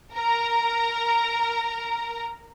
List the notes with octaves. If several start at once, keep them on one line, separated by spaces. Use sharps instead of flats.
A#4 A#5